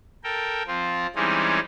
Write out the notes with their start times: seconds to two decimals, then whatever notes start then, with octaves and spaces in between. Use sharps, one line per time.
0.24 A4 A#4 G5
0.67 F3 C4 F4
1.15 E3 G3 G#3 C4 C#4 D#4